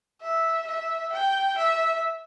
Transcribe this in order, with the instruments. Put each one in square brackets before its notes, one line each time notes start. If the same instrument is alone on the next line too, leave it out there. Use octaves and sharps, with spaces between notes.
[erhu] E5
E5
G5
E5